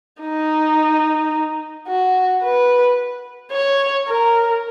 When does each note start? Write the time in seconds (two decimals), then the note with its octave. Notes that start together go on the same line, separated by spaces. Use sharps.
0.22 D#4
1.88 F#4
2.43 B4
3.52 C#5
4.08 A#4